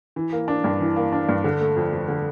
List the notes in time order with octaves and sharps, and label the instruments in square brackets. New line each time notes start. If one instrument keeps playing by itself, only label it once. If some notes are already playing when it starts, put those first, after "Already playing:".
[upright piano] E3
A#3
D4
G2
E3
A#3
D4
G2
D3
A3
F2
F2
D3